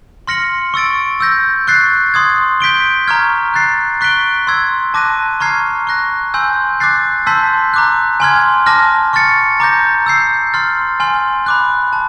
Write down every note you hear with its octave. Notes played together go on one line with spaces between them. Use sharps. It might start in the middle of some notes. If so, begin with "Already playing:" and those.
C6 F6 A#6 C#7 F#7
C#6 E6 A6 D7
E6 G6 A#6
C#6 F#6 A6 C7
C6 D#6 G#6
G6 B6 D7 G7
A#5 C#6 F6 G#6
F#6 A6 C7
C#6 F#6 B6 D7 G7
C6 E6 G#6
A5 D6 F#6 A#6 D#7
A#5 C#6 F6 G#6 C7
C#6 F#6 A#6
G#5 C6 E6 G6
D6 F#6 A6 C7
A5 C6 E6 G6 B6
A#5 D6 F#6
G#5 C6 F6 G#6
A5 D6 F6 A#6
C#6 F6 A6 C#7
A#5 D6 G6 A#6
E6 G6 C7
C6 F6 A6
G#5 C6 F6
B5 D6 F#6
A5